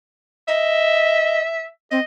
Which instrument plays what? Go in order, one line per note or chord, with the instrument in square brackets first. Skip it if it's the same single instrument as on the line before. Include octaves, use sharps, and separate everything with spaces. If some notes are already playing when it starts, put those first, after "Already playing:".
[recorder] D#5 [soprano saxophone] E5
[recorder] C4 [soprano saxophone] D#5